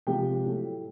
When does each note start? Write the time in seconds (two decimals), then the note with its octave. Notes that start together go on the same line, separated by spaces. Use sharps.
0.07 C3 F3 G#3 G4 G5
0.44 A2 F#3 A3